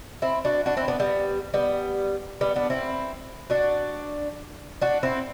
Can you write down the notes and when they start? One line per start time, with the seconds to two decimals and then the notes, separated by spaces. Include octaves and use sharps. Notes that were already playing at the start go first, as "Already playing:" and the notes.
0.22 C4 E4
0.45 D4 F#4
0.66 D4 F#4
0.77 C4 E4
0.88 B3 D4
1.00 G3 B3
1.54 G3 B3
2.41 G3 B3
2.56 B3 D4
2.70 C4 E4
3.50 D4 F#4
4.82 D4 F#4
5.03 C4 E4